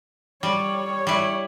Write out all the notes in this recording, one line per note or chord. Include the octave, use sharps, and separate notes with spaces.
G3 C#5
G3 E4